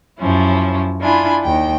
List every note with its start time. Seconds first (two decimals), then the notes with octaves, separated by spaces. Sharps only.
0.19 F#2 F3 C#4 E4
1.00 D4 E4 F4 G#5 B5
1.43 D#2 G5